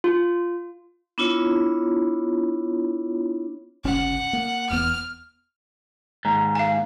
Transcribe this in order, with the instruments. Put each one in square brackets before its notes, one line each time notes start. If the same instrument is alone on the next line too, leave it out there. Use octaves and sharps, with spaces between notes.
[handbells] F4
[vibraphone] B3 D4 E4 F4 C#5
[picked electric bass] G1 C#2 C#4 [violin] F#5
[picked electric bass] A#3
[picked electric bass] E1 E2 B3 [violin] F6
[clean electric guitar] D#2 G#2 [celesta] A#5
[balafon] F5 G#5